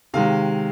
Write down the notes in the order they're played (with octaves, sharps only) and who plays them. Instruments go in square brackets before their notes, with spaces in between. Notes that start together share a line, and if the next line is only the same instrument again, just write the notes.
[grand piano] C3 D#3 G#3 F5